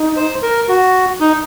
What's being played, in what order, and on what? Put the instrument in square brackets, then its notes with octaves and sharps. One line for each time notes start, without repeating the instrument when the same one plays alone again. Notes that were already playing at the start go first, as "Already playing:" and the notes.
Already playing: [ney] D#4
[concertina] C5
A#4
F#4
D#4